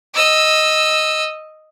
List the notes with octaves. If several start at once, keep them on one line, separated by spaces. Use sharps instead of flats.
D#5 E6